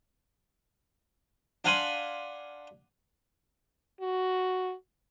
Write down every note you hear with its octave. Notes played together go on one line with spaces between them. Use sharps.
D4 F5 F#5 G#5 B5 C6
F#4